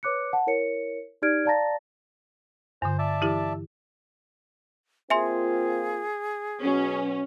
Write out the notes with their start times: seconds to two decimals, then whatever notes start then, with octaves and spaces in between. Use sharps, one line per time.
0.03 B4 C#5 D6 F#6 C#7
0.33 F#5 A5
0.47 E4 A#4 C#5 C#7
1.22 D#4 G4 D5 F6 G#6 D7
1.45 D5 F5 A5 A#5 A6 A#6
2.82 G2 D3 C5
2.99 D5 E5 A5
3.21 E3 E4 G4
5.10 A#3 C4 F4 G#4 E5 G#5 C6
6.62 B2 F#3 C#4